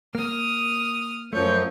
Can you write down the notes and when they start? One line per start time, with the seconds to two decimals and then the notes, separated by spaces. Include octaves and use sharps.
0.15 A#3 D#6 F6
1.33 F#2 F3 A3 C#5 G6